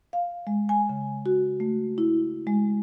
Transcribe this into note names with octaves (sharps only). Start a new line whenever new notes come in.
F5
G#3
G#5
C#3
F#4
A3
E4
G#3